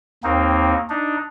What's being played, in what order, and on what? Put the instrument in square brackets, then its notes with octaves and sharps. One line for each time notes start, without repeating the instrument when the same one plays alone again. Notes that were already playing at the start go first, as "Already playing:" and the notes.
[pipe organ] D#2 A#3 C4 D#4
D4 D#4